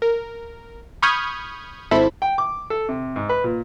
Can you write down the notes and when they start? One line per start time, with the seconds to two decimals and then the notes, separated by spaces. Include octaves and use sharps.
0.02 A#4
1.02 B5 C#6 D#6 F6 G6 G#6
1.91 G#1 E4 A4 C5 E5 B5
2.22 G5
2.38 D6
2.70 A4
2.89 C3
3.16 G#2
3.29 B4
3.44 A#2